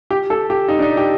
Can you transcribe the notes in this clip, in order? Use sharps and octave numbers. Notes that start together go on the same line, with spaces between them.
G4
A4
G4
D#4
D4
D#4
G4